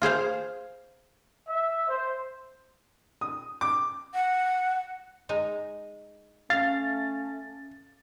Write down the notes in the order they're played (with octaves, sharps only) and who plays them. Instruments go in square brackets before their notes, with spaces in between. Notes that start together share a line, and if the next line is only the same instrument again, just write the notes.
[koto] F4 G#4 C5 F5
[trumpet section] E5
C5
[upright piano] D#6
D6
[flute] F#5
[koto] G#3 D#4 G#5
[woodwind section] A3 C#4 [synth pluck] F5 [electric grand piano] A6